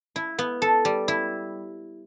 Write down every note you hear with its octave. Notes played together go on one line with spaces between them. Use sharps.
E4
B3
A4
G3
E4